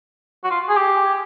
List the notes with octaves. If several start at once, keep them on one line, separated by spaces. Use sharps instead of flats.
F#4
F4
G#4
G4